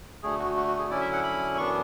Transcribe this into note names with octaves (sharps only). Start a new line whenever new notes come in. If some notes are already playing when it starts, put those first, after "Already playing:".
D2 D3 A3 G#4
F#4
F#4
F#4
G#4
D3 F#3 C#4 E4 D5
E5
F#5
B5
F#2 E3 B3 D4 C#6